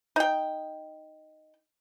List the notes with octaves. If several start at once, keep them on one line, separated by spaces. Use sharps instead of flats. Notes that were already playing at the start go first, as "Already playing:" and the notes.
D#4 G5